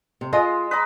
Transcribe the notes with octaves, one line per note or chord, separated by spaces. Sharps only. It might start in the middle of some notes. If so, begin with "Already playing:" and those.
C3
G#3 F4 D#5
B4 D#5 A#5